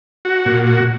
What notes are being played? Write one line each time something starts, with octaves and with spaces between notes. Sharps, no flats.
F#4
A#2
F#4